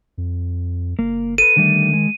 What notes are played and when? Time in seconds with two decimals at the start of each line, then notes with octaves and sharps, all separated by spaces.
0.18 F2
0.99 F#1 A#3
1.38 A4 B4 D#7
1.56 D3 D#3 G3 A3
1.93 G#3